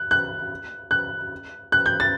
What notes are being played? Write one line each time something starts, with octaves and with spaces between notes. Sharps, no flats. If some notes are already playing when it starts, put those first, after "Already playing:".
Already playing: F#6
F#6
F#6
F#6
G6
A6